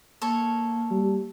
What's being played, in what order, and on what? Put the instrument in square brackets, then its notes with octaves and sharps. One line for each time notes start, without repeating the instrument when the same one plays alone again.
[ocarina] A#3 [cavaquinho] A4 C#5
[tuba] G3